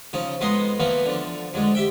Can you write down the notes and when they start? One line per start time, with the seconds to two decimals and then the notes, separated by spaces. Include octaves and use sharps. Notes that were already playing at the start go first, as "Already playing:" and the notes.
0.13 C#3 F3 D#4
0.41 F2 G#3 B3 D#5 A#5 C6
0.80 E3 F3 A#3 B3 B4
1.06 D3 F3
1.54 F2 D3 G#3
1.75 G4 E5 G5